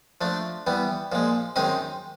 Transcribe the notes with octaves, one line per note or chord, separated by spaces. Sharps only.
F3 A3 D4
E3 G3 B3
A#2 F3 G#3
F#2 D#3 G#3 C4 D#4